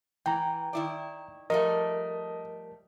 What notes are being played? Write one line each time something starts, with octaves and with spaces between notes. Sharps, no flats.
E3 G5 A#5
D#3 E4 D5
F3 G3 A3 A#4 D#5